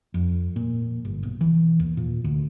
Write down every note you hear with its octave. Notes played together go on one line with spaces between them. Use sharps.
F2
A#2
G1
B1
E3
D#2
A#2
D2